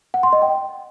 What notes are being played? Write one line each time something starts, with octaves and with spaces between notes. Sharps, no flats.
F#5
C6
D#5
G5